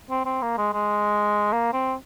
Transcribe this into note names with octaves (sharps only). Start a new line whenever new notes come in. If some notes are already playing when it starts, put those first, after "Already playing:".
C4
C4
A#3
G#3
G#3
A#3
C4